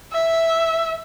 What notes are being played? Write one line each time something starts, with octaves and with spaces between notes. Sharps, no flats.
E5